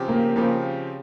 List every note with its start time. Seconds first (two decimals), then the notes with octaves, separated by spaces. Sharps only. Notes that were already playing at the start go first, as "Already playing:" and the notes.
Already playing: C#3 F3 C4 G4
0.08 A#3
0.36 C#3 F3 A#3 C4 G4